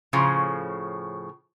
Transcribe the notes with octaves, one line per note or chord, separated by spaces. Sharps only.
A2 C#3 F3